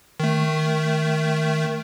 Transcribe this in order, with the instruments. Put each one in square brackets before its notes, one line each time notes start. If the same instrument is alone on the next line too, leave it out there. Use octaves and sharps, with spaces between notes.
[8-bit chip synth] D#3 A3